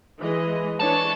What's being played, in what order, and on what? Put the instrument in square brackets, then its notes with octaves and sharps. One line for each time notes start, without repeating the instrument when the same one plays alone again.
[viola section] E3 G#3 D#5
[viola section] E3 D4 C#5 [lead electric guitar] A4